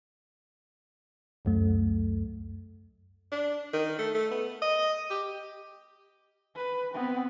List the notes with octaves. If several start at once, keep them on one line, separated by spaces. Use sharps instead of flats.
C#2 F#2 A3
D4
D#3
A3
A3
B3
D#5
G4
B4
B3 C4